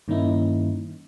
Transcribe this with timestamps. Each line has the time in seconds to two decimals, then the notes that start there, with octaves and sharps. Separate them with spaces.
0.08 G2 D#3 A#3 C#4 D#4 E4